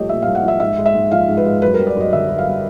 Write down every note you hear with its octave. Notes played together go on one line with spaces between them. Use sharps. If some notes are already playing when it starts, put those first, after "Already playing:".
Already playing: C2 F3 A3 G4 C#5 D#5
A#2 E5
C2 F5
F#5
F3 E5
G#2 E5
G#3
E5
G#2
F3 F5
G#2
B4
G#3
F#2 B4
G3 A#4
D5
F#2 D#5
D3 E5
F#2
F5
G3